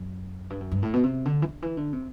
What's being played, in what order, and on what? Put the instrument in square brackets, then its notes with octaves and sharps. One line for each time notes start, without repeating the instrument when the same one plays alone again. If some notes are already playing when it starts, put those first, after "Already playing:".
Already playing: [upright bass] F#2
G2
F#2
G2
A2
B2
C3
D3
E3
D3
E3
D3
C3